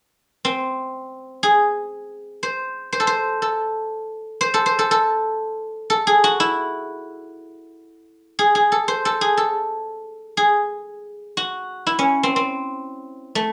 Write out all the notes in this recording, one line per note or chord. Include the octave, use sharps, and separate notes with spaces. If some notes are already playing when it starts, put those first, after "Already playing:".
C4
G#4
C5
C5
A4
C5
A4
C5
A4
C5
A4
A4
A4
G#4
F#4
E4
G#4
G#4
A4
C5
A4
G#4
A4
G#4
F#4
E4
C#4
C4
C4
A3